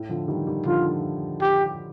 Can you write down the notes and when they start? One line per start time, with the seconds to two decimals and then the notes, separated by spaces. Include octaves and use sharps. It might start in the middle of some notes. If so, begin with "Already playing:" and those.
Already playing: A2
0.09 D3 F3
0.28 D#3 G3
0.47 D#3 G3
0.66 D3 F3 F4
1.41 G4